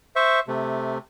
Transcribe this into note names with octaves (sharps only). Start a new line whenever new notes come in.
C5 E5 C#6
C3 A3